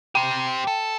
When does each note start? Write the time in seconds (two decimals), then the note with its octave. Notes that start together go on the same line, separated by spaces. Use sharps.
0.15 G4 C5 G5
0.67 A4